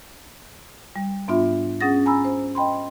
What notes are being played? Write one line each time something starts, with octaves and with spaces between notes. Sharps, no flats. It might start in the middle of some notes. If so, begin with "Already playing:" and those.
G3
G#2 B3 D4 F4 E5
C#4 G#4 F#5 D#6 A6 A#6
G#5 A#5 B5 E6
C5
D#5 G5 B5 C6